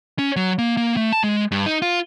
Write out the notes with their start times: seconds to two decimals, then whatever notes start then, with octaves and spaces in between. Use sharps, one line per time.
0.19 C#4
0.36 F#3
0.59 A#3
0.77 A#3
0.97 A3
1.12 A5
1.24 G#3
1.52 G2
1.66 D#4
1.82 F4